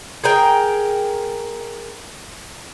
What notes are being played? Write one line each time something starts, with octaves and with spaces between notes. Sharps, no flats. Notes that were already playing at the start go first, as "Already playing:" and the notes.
G#4 A#4 G5